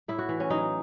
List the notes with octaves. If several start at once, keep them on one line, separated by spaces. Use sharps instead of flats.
A2 E4
F#4
E3
C#4
F#3 D#4